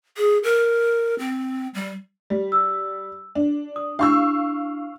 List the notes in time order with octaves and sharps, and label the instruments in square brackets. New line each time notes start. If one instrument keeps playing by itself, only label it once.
[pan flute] G#4
A#4
C4
G3
[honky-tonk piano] G3
[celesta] E6
[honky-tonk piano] D4
[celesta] D#6
[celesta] D4 E4 [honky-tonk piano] F5 C#6 E6